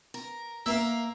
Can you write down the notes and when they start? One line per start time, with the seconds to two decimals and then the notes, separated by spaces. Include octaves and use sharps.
0.14 A#4
0.66 A#3 A#4 E5 F5